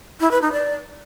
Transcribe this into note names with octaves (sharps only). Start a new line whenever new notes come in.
E4
B4
D#4
D5